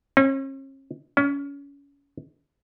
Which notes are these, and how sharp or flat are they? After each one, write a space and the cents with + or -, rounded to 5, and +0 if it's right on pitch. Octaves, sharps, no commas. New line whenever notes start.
C#4 -40
C#4 +30